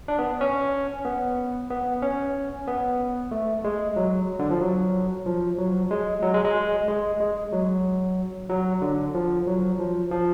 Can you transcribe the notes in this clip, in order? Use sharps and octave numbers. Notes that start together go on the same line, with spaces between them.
D4
B3
C#4
B3
B3
C#4
B3
A3
G#3
F#3
D3
F3
F#3
F3
F#3
G#3
F#3
G#3
G#3
G#3
G#3
F#3
F#3
D3
F3
F#3
F3
F3